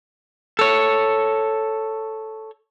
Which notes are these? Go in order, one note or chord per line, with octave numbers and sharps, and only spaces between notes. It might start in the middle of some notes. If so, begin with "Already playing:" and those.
A4 C#5